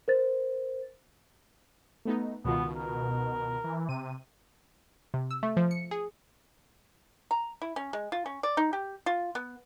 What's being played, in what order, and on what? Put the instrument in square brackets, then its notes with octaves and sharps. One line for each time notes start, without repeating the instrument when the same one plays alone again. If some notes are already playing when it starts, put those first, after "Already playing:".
[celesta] A#4 C5 A6
[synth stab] A3 B3 D#4
[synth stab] C#2 D#3 F4 [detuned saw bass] B2 [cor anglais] B3
[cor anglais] A#4
[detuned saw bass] E3
[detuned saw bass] C3 [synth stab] D#7
[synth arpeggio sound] C3
E6
A3
F3
C#7
G#4
[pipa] A#5
E4
C#4
G#3
F4
C#4
D5
D#4
G4
F4
B3